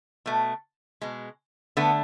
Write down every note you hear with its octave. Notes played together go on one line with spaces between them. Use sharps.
B2 A3
B2 G#3
D3 A3 B3